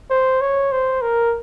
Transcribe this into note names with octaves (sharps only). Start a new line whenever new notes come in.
C5
C#5
C5
A#4